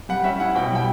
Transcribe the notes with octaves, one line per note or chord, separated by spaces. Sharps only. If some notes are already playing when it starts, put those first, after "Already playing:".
G3 F#5
C#4 E5
E4 F#5
B2 G5
G3 G5